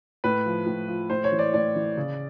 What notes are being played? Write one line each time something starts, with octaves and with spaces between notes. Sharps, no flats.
A2 B4
F3
A2
F3
A2 C5
C#5
E3
D5
A2 D5
E3
C#3